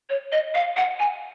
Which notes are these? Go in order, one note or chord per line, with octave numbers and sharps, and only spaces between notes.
C#5
D#5
F5
F#5
G#5